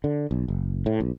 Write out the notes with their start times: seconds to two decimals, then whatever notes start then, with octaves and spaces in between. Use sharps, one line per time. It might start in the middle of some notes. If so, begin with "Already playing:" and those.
0.04 D3
0.31 B1
0.48 F#1
0.86 A2
1.00 B1